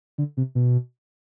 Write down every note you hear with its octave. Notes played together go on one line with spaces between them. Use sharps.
D3
C3
B2